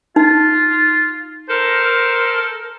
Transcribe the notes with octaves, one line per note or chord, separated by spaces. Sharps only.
D#4 F4
A4 A#4 C5